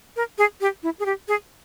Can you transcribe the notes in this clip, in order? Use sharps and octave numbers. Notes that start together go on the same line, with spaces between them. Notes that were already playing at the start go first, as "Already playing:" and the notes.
A#4
G#4
G4
E4
G#4
G4
G#4